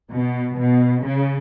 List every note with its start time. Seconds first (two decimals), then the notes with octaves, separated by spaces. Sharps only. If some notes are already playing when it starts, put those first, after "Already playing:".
0.11 B2
0.57 B2
1.04 C#3